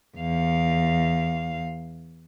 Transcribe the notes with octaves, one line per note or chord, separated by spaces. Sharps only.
E2 F5